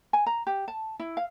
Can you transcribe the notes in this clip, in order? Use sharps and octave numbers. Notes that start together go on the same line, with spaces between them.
G#5
A#5
G4
A5
E4
F5